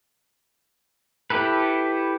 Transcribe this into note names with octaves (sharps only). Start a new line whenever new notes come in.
E4 G4 A4 B4